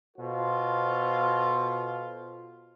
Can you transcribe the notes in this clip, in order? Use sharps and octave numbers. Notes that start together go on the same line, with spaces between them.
B2 F4 A4 C5